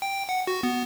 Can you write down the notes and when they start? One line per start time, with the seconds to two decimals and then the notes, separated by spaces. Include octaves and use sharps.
0.02 G5
0.29 F#5
0.47 F#4
0.63 B3